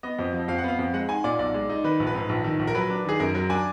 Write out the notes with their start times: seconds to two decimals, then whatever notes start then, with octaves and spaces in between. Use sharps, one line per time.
0.03 B3 D#5
0.19 F2
0.33 F3
0.48 F2 F5
0.58 F#5
0.64 B3 F5
0.79 F2
0.93 G#3 F#5
1.09 D#4 G#5
1.24 A#2 D5
1.39 B1 D5
1.54 G#3
1.69 D#4
1.84 D#3 B4
2.00 A#1
2.07 B4
2.14 G#2
2.29 A#1
2.44 D#3
2.59 A#1
2.67 A#4
2.75 F#3 B4
2.90 D4
3.05 D#3 G#4
3.20 F#2 A#4
3.35 F#3 A#4
3.50 D4 G#5